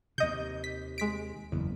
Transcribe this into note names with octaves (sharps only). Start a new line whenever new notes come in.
D#2 C3 D#5 G6
B6
G#3 B6 D7
F#1 E2